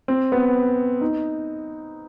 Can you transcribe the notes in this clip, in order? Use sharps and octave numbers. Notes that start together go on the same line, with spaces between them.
C4
B3
D#4